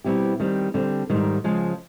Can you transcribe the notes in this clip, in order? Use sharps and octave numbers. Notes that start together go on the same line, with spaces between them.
B2 G3 C4 E4 G4
D#3 G3 C4
D3 G3 C4
G#2 D#3 G3
C#3 F3 G#3